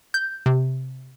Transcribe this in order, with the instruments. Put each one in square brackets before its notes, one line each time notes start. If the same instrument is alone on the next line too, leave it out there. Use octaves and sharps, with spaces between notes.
[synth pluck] G6
C3